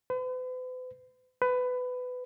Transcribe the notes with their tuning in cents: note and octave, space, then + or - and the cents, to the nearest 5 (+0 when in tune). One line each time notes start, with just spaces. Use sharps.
B4 +45
B4 +20